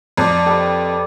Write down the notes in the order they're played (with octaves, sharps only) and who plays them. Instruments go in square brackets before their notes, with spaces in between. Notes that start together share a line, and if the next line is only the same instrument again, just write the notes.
[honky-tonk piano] F2 [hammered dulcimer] D5 A#5
[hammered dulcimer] G4 A4 B4